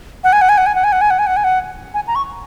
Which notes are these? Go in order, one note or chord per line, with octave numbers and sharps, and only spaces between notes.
F#5
G#5
F#5
G#5
F#5
G#5
F#5
G#5
F#5
G#5
F#5
G#5
F#5
G#5
F#5
G#5
A#5
C#6